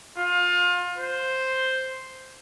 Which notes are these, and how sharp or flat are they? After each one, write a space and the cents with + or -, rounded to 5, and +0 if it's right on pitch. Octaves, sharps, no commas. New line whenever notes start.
F4 +25
C5 +0